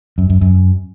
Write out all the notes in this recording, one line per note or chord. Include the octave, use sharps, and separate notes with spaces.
F#2
F#2
F#2